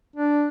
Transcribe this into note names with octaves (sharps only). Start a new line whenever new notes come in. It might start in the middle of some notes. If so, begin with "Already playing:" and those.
D4